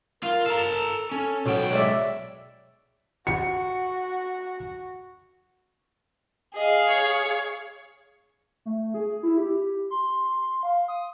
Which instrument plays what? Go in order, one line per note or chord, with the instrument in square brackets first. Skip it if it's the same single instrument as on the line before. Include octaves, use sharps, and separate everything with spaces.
[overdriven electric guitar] F4 F5 [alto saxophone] A#4
[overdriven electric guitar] A4 A#5
[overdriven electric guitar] C#4 [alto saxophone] A4
[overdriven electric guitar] B1 G5 [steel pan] F#4 C#5
[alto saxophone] G#3 [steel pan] C#5 D5 E5
[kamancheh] F#4 [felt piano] C#7
[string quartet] G#4 F5 [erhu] D#5
[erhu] C#5
[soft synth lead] A3
G#4
E4
G4
C6
F5
D#6